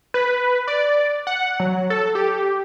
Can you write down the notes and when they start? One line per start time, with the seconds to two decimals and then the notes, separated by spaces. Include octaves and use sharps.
0.14 B4
0.68 D5
1.27 F#5
1.60 F#3
1.90 A4
2.15 G4